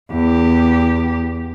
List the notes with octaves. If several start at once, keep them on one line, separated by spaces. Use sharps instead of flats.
E2 G4